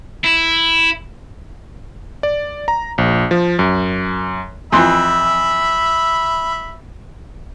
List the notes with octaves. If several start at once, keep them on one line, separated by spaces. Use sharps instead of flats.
E4
D5
A#5
A#1
F3
F#2
F2 E3 E5 B5 C6